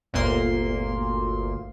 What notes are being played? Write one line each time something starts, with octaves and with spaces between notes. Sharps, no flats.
G1 D2 A#2 A#3 C6